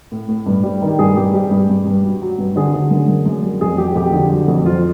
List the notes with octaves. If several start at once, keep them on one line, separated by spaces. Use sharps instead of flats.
A2
A2
G2
G3
D#3
G2 G#4
G2 G4
G3 G4
G2
G2
G2
F#3
F#3
G2
D3 G#4
D3
F#2
F#2
F#2
G3
F2 G#4
F#3 G4
F2 G4
D3
F#3
F2
F3 F4